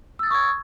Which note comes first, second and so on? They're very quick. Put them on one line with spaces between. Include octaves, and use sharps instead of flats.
E6 A6 D#6 C#6 G#6